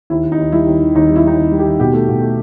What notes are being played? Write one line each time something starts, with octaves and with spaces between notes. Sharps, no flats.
D#2 E4
D#2
D#4
D#2
G3 E4
D#2
D#3
D#2 D#4
G3
E4
G3 D#4
D#2
G3
G4
D#3
B2 G4
A3
B2
A3